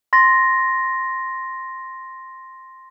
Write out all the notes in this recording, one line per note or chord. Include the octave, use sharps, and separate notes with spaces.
C6 A6 A#6